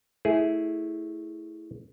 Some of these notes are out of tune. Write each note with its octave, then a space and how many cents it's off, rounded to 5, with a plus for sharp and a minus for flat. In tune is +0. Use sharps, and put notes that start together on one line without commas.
A3 +0 E4 -15 G#4 +0